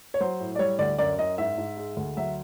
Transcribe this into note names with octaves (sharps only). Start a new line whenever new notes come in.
C#5
F#3 C5
A2
D5
G3 C#5
D2 D5
F#2 D5
F#2 D#5
G#2 E5
G#2
G#3
D2
F#3 E5